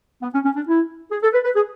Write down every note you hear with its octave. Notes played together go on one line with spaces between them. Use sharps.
B3
C#4
C#4
D4
E4
G#4
A4
B4
B4
G#4